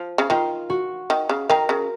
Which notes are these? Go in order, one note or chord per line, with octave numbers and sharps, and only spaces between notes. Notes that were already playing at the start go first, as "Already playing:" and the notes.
Already playing: F3
C#3
D#3 F4
F#4
D#3
C#3
D#3 A#4
C#3